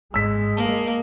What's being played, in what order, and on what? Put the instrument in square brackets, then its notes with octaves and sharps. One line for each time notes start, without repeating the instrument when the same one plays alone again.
[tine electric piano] G#1 G#2 [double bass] G#3 [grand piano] E6 B6
[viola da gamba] A#3 [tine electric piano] A5